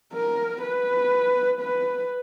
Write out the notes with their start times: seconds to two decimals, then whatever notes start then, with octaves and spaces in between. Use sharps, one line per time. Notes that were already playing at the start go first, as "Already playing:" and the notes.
0.13 A#4
0.62 B4
1.60 B4